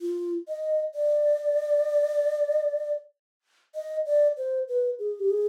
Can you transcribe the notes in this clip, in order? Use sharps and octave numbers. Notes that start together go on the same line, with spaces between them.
F4
D#5
D5
D#5
D5
C5
B4
G#4
G4
G#4